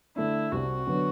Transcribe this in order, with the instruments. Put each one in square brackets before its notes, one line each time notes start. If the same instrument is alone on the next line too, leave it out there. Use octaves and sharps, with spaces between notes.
[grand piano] D3 A3 D4 [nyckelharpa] E4
[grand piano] C2 C3 G3 C4 [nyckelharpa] F#4
[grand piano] D3 F#3 B3